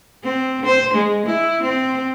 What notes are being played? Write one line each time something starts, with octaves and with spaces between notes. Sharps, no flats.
C4
C5
G#3
E4
C4